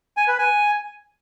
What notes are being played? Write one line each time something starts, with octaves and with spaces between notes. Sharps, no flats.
G#5
B4
G#5